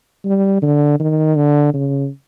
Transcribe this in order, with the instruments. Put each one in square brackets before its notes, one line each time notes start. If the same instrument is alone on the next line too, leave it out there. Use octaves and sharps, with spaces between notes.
[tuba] G3
D3
D#3
D3
C#3